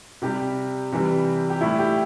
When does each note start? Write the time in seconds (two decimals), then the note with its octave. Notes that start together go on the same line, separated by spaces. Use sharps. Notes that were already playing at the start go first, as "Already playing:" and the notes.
0.22 C3 G3 G4
0.92 C3 E3 G3
1.50 G4
1.61 A2 G3 E4
1.79 G4